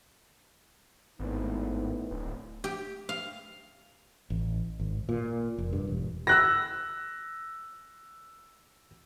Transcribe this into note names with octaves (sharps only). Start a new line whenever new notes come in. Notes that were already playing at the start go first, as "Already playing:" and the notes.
G#1 A2 B3 D#4
D1
G4
F5
A1
G#1
A#2
F1
G2
E1
E6 F#6 A#6